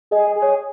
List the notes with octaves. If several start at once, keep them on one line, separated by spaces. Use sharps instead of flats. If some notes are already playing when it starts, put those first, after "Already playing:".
G#4 D#5
D#5
G#4
C#5